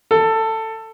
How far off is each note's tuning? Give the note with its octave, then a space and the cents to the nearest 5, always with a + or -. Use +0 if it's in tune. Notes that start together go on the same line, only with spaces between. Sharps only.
A4 +15